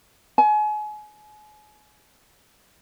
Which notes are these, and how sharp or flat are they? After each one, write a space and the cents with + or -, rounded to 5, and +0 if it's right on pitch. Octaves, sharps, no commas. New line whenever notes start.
G#5 +35